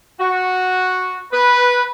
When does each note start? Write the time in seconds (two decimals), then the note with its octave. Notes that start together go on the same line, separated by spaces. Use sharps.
0.18 F#4
1.32 B4